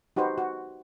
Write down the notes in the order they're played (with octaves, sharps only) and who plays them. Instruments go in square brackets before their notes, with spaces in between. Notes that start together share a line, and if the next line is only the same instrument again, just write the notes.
[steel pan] D#4 F#4 G4 B4 C5
F#4